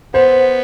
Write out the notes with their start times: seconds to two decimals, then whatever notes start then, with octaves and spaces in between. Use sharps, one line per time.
0.14 B3 C5